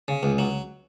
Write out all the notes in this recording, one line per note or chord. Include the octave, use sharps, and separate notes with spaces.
C#3
C#2
F#3